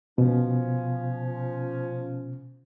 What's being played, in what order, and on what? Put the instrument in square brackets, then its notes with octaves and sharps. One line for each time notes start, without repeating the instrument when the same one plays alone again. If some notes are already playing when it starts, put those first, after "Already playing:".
[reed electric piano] B2 [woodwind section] F3 C#4